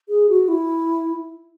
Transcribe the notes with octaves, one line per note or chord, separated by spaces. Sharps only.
G#4
F#4
E4